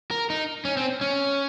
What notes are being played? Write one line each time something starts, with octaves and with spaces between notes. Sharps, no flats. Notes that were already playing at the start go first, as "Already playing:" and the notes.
A#4
D#4
C#4
C4
C#4